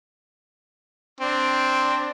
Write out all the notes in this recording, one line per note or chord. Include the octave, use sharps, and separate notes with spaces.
C4 D4